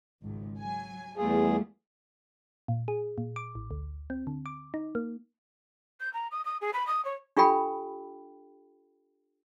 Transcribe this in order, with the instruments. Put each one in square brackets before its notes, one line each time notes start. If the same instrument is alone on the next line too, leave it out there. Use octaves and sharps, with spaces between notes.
[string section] G#1 C#2
F#3 G#5
[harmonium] E2 G#4 [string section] G3 A3 F4
[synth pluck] A#2
G#4
A#2
D6
A1
D2
C4
D3
D6
D#4
A#3
[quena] G6
A#5
D#6
D#6
G#4
B5
D#6
C#5
[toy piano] D4 F4 G4 A4 G5 B5